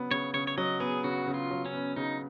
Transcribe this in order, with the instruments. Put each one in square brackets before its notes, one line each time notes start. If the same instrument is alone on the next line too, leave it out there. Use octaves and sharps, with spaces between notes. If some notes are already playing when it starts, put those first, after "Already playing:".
Already playing: [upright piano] C#3 F#3 B3
[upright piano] C#3 [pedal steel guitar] C#5
[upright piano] C#3 [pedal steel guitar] C#5
[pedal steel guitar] C#5
[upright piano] F#3 [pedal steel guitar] D#5
[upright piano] B3 [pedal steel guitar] G#4
[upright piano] C#3 [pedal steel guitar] F#4
[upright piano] C#3
[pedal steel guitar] F4
[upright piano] F#3
[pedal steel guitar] C#4
[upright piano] B3
[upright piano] C#3 [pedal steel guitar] D#4